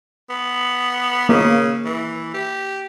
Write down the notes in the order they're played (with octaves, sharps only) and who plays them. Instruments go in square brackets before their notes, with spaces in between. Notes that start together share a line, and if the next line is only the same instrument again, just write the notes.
[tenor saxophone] B3
[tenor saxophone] C#3 [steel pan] A#3
[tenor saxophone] E3
G4